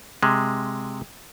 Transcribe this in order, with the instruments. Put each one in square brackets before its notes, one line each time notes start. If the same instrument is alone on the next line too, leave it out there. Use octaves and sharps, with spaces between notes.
[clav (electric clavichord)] C3 G#3